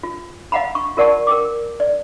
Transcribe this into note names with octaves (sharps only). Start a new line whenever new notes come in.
F4
D#5 F5 F#5 A#5 B5
C#6
F4 A#4 D5 F#5 A5 C#6
A#4 G5 D6
D5